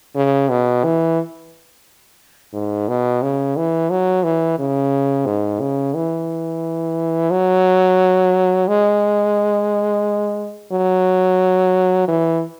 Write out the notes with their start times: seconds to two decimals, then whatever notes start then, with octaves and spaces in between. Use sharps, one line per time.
0.16 C#3
0.49 B2
0.84 E3
2.53 G#2
2.88 B2
3.22 C#3
3.56 E3
3.90 F#3
4.24 E3
4.59 C#3
5.26 G#2
5.60 C#3
5.94 E3
7.31 F#3
8.68 G#3
10.72 F#3
12.08 E3